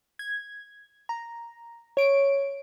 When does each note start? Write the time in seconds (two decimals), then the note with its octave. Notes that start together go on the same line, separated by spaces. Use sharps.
0.19 G#6
1.09 A#5
1.97 C#5 D7